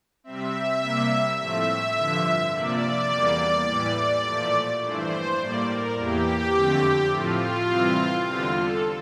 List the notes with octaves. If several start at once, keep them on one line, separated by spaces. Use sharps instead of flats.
C3 G3 C4 E5
C3 G3 A#3
A2 F3 A3 C4 E5
G2 D3 F3
C3 F3 A#3 D5
E2 E3 G3 A#3
A2 E3 G3
A#2 F3 A3
G2 E3 A3 C5
A2 G3 A#3 D5
A#4
E2 E3 A#3 G4
F2 D3 A3 C4
A2 F3 A3 C4 F4
C3 E3 G3 C4
E2 D3 G3 C4 F4
A4